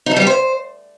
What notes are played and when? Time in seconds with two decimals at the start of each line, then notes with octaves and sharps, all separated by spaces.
0.06 D#4
0.11 A4
0.17 G3
0.22 G4
0.27 C5